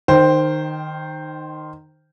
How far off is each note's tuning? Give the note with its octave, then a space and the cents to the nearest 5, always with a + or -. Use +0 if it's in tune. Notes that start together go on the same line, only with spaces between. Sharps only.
D#3 -15 C5 +0 G5 +0